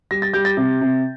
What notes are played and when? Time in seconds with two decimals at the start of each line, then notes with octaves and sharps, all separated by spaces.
0.11 G3 A#6
0.22 A6
0.33 G3 G6
0.45 A6
0.57 C3
0.81 C3